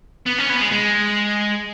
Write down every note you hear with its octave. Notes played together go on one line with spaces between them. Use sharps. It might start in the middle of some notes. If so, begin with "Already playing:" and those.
B3
C#4
B3
G#3
G#3